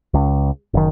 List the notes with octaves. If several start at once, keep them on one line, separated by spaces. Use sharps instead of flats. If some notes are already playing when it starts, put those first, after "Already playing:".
C#2
F#1 D#3